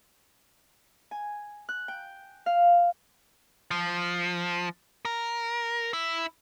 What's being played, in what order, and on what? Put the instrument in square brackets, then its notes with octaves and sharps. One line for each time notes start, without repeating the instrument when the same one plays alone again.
[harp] G#5
F#6
G5
F5
[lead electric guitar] F3
A#4
E4